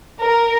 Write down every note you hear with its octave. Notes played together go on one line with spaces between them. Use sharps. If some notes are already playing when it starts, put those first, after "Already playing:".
A#4